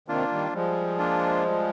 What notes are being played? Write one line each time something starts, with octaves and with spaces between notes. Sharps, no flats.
C3 D#3 A#3 D4 F4
D#3 G3
F3 G3 G#3
A#3 D4 F4
G3